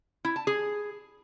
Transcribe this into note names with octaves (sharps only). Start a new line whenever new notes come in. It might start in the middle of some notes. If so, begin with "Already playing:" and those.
E4
A5
G#4